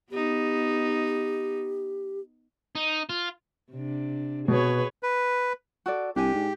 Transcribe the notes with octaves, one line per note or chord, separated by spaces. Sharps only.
B3 D#4 G4
D#4
F4
C3 D4
B2 G#4 B4 C#5
B4
F#4 A4 D5
C2 D4 G4 G#5
G#2